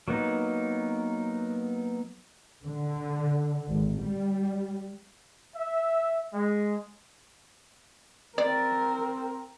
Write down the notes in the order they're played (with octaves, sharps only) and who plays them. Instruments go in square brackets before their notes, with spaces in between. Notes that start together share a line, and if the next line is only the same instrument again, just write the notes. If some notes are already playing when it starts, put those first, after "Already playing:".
[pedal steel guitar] F#3 A#3 B3 D#4
[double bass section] D3
G#1
G3
[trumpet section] E5
G#3
[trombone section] C4 [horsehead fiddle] A#4 [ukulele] D5